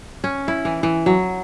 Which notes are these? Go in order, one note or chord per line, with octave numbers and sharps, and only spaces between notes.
C#4
E4
E3
E3
F#3